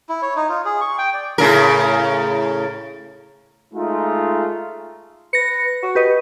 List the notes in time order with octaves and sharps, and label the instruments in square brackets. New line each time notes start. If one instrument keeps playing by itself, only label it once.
[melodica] E4
C#5
D#4
F4
G#4
C#6
G5
D5
[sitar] A2 C#3 A#4
[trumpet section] G#3 A3 D#4 F4
[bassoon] B4 [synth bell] A#6 C#7
[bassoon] F#4
[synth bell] G4 B4 D#5